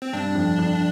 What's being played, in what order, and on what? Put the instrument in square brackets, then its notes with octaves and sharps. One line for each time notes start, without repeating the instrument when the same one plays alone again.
[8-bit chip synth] C4
[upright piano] G2 [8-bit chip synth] D4
[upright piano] F2
F2